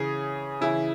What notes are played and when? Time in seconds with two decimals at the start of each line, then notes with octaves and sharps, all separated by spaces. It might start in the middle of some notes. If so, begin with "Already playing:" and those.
Already playing: C#3 E3 G#4
0.61 C#3 E3 E4